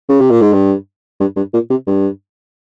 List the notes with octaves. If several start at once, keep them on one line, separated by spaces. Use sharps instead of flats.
C#3
C3
A#2
G#2
G2
G2
G2
A#2
C3
G2